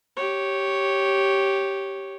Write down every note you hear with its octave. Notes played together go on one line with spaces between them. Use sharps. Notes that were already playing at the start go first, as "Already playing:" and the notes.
G4 C#5